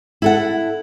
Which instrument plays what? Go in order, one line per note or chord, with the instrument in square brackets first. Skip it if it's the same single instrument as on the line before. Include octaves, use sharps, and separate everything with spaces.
[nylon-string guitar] E4 A4 F#5